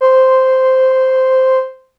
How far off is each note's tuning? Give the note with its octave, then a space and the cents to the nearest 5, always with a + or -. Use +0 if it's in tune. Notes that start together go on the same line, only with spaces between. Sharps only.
C5 -5